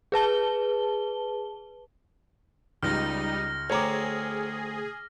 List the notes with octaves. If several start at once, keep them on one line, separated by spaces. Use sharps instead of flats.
G#4 B4 A5 G7
C#2 G3 D#4 F6 A#6
D2 C4 G#4 C#5 A#5 D6